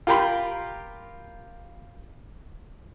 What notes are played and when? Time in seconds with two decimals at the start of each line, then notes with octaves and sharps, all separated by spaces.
0.07 F4 G4 A#4 G5 B5 C6